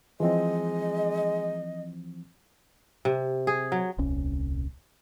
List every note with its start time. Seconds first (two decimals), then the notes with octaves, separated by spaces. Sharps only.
0.20 E3 F3 G#3 C4 D#5
3.05 C3
3.47 G#4
3.72 F#3
3.98 D#1 C2 C#4